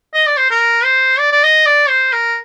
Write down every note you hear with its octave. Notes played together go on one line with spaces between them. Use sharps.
D#5
D5
C5
A#4
C5
D5
D5
D#5
D5
C5
A#4